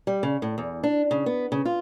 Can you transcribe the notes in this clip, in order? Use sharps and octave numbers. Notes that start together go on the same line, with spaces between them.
G3
C#3
A2
E2
D4
C#3
B3
C#3
F4